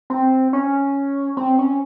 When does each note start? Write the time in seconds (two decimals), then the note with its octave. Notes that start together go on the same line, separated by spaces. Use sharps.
0.10 C4
0.53 C#4
1.37 C4
1.59 C#4